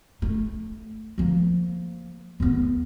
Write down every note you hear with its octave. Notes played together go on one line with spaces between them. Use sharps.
A3
F3 A#3
D#2 B3